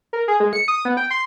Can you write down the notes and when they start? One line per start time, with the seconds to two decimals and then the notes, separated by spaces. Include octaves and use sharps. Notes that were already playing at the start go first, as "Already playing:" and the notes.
0.13 A#4
0.28 G#4
0.40 G#3
0.53 C#7
0.68 D#6
0.85 B3
0.97 G5
1.10 C6